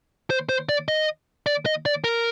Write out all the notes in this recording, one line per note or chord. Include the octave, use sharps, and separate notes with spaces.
C5
C5
D5
D#5
D5
D#5
D5
A#4